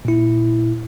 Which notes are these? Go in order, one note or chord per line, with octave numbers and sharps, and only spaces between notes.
A#2 E4